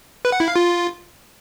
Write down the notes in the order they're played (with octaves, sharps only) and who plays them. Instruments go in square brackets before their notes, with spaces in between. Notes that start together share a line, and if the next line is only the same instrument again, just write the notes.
[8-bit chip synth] B4
F#5
E4
F5
F4